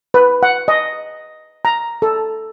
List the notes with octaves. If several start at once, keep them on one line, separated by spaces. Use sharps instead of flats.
B4
F#5
D#5
A#5
A4